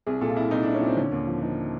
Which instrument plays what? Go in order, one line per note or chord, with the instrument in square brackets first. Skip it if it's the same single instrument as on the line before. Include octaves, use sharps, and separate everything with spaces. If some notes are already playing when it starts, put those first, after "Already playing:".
[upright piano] C2 G#4
A#2 A4
F4
C2 E4
C2 D#4
C2 D4
C#4
A#2 C4
D3 C#4
D#2
F3
F3 D#4